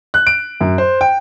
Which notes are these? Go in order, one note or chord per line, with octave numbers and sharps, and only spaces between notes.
F#6
D7
F#2
C5
G5